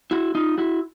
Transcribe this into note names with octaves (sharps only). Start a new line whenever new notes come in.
E4 F#4
D#4 F4
E4 F#4